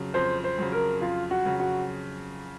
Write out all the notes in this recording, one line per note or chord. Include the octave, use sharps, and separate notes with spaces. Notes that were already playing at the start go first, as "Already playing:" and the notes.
Already playing: F2 C#3 F#3
F2 C5
C5
C#3 F#3
A#4
F2 F4
F#4
C#3 F#3
F#4